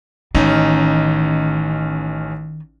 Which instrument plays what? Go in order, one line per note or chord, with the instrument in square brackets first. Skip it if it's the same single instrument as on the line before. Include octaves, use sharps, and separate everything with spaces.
[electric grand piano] A1 C#4 D#4 [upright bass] D#3